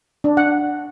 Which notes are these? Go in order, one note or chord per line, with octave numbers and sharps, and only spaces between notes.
D4
F#5